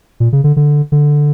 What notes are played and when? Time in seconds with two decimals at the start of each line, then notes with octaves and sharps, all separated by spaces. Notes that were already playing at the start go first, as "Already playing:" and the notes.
0.20 A#2
0.33 C#3
0.44 D3
0.56 D3
0.92 D3